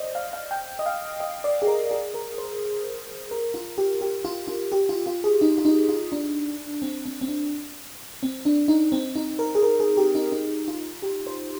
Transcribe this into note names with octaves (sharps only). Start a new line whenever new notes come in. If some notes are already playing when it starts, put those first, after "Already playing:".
Already playing: C5 D5 D#5
F5
F5
G5
D#5
F5
D#5
D5
G#4
A#4
G#4
A#4
C5
A#4
F4
G4
G4
F4
F4
G4
F4
F4
G#4
D#4
F4
D#4
F4
D4
C4
C4
C4
D4
C4
D4
D#4
C4
D#4
A#4
G#4
A#4
G#4
G4
D#4
D#4
F4
G4
C5